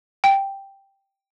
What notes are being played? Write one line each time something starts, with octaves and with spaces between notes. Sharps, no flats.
G5